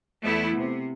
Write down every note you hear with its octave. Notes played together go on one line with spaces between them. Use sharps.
E2 A3 B3 E4
C3